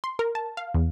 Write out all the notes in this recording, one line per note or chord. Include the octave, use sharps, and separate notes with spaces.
C6
A#4
A5
F5
E2